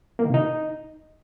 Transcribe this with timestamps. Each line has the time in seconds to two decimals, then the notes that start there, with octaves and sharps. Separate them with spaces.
0.19 A#3
0.24 D#3
0.29 C3
0.34 D#4